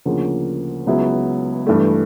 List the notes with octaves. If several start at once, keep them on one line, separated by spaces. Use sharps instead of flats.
D2 C#3 F3 A#3
C#2 C#3 F#3 B3 E4
G2 E3 A3